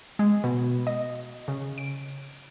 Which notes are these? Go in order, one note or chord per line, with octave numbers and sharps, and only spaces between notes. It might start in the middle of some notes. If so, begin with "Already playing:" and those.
G#3
B2
D#5
C#3
D7